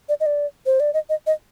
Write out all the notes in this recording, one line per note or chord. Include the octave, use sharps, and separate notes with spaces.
D5
D#5
D5
C5
D5
D#5
D#5
D#5